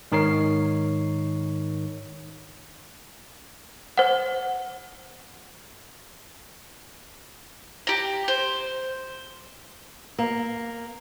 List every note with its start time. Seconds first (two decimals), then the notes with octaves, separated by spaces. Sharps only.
0.12 G#2 D#3 D#4 A#4 C#5 C7
3.97 C5 F#5
7.87 G4 A#5
8.28 C5
10.18 A#3